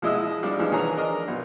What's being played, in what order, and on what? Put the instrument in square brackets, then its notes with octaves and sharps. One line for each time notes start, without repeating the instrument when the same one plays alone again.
[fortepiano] F3 G#3 E4 D#5 D#6 E6
F3 G3 D4
E3 F3 G#3 D#4
D#3 E3 G#4 C#5 A#5
D4 A#4 D#5
B1